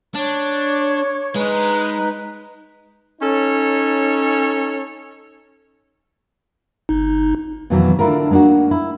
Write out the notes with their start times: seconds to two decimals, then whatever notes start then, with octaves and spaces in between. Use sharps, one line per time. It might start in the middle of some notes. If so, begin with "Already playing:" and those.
0.15 D4 C#5
1.35 G#3 D#4 B4
3.20 C#4 D#4 A4 C#5
6.89 G1 D#4
7.70 F2 B2 D#3 E3 F#3
7.99 D3 D4 E4 F4 A#4
8.31 G#3 A#3 D4 D#4 F#4
8.71 E4